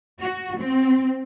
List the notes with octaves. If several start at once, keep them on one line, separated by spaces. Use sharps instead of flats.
F#4
C4